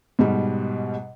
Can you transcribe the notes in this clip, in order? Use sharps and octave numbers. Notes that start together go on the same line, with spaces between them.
G#2 B2 G3